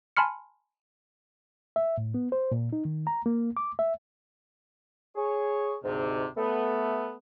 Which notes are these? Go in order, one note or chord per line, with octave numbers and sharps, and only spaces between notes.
G#5 A5 B5 C6 F6 C#7
E5
A2
B3
C5
A#2
D#4
D#3
A#5
A#3
D6
E5
G#4 C#5
D2 G#2 C3
A3 B3